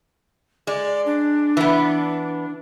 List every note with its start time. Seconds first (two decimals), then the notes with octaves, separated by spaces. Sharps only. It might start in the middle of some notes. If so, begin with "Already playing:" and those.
0.67 G#3 D5
1.06 D4
1.57 E3 B3